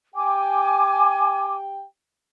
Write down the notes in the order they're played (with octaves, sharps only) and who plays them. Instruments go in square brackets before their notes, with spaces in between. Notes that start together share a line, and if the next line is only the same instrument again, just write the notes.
[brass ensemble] G4 G5 [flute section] G#5 D6